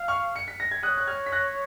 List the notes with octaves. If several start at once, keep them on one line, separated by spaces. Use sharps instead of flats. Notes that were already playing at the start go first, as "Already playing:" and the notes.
Already playing: F5
C#6 F6
C#7
B6
A#6
G#6
C#5 D#6 F#6
F#6
F6 G#6
B6
F#6 A#6